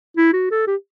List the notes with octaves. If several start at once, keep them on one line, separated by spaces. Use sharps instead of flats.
E4
F#4
A4
G4